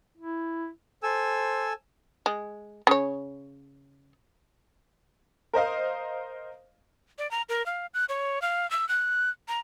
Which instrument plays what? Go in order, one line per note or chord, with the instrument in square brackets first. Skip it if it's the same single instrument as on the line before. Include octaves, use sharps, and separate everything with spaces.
[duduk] E4
[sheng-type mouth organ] A4 G#5 E6 [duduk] C5
[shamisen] G#3
C#3 C#5
[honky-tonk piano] A#4 C5 D#5 F5
[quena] D5
A#5
A#4
F5
F#6
C#5
F5
E6
F#6
A#5